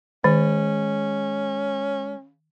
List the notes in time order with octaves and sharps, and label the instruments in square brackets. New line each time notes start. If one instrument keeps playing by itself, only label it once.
[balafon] D#3 [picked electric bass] G#3 [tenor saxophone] C#4